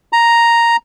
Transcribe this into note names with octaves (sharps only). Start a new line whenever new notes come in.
A#5